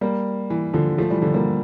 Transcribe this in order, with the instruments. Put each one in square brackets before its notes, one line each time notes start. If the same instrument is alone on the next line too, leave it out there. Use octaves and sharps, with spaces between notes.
[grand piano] G3 A#3
E3
D3 F3
F3 A3
E3 G3
D3 F3
G3 A#3